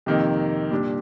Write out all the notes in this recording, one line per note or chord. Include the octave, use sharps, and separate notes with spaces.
F2 C3 D#3 A#3 D#4
A#2 G3 D4